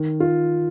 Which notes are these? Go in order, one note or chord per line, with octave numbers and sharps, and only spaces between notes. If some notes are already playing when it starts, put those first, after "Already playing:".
Already playing: D#3
F4